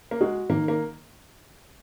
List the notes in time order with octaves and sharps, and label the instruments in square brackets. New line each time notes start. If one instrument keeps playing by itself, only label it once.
[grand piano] A#3
[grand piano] G#3 [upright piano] F#4
[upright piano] D#3 [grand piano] A#3
[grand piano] A#3